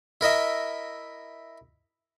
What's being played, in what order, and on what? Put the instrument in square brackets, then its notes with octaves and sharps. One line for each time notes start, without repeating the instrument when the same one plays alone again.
[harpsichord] E4 A#4 D#5 E5